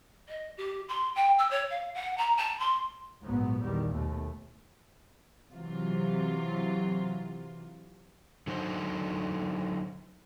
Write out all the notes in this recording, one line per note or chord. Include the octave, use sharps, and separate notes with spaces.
D#5
G4
C6
G5
E6
C#5
F5
F#5
A#5
A5
C6
A#1 G#2 F#3 B3
A#1 E2 D#3 G3
D#2 B2 A3
C3 E3 F#3 F4
D3 F#3 D#4 C5